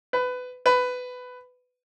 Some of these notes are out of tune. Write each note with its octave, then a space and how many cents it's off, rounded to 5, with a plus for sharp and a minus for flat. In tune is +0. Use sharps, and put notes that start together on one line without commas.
B4 +20
B4 +15